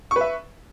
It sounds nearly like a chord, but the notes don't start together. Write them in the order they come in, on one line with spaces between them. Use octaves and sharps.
C#6 B4 E5